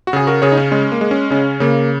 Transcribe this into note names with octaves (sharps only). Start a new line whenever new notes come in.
F#4
C#3 G#4
F#4 A#4
C#3 G#4 C#5
D#4
C#4
G#3 C#4
A#3
G#3
C#4
C#3 C#4
C#3 A#3